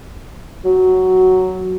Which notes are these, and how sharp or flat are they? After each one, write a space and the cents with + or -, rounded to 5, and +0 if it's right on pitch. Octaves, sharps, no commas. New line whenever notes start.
F#3 +5